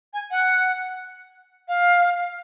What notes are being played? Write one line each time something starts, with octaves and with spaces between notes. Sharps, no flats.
G#5
F#5
F5